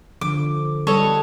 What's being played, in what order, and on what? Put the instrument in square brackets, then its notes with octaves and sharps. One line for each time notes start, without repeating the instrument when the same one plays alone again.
[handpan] D3 F3 [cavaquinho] D6
[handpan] G3 B4 [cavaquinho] A4 C#5 D#5